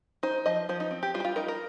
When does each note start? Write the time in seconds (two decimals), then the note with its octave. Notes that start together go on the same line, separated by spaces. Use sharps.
0.23 D#4 C5
0.46 F3 D#5
0.69 F3 C5
0.80 D#4
0.91 C4
1.03 G4
1.14 G3 F4
1.20 G4
1.25 F4
1.36 D#4 A#4
1.48 A#4